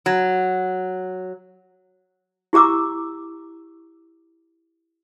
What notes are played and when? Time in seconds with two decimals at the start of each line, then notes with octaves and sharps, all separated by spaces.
0.06 F#3
2.53 E4 G4 A#5 D6 E6